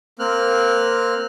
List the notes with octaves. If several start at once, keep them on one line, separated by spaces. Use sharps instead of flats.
A#3 C4 F6 F#6